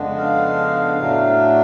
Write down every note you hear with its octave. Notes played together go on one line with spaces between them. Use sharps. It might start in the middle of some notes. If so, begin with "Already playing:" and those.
Already playing: F2 C#3 G#3 B3 D4
F5
A2 F#3 A3 D4